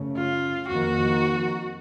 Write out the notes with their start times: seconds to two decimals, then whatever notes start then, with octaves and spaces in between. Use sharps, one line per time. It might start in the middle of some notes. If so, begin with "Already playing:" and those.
Already playing: F#2 C#3 A3 C#4
0.17 F4
0.68 F2 D#3 A#3 F#4